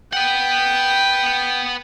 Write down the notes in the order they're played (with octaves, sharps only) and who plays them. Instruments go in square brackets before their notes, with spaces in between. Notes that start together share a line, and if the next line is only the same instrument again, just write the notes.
[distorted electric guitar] B4 F#5 [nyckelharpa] G5